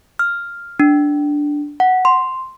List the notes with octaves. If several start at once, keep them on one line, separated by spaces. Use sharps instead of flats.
F6
D4
F#5
C6